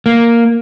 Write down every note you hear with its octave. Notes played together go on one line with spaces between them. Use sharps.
A#3